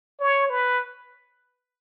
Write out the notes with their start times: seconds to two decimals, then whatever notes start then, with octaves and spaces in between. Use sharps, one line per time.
0.20 C#5
0.50 B4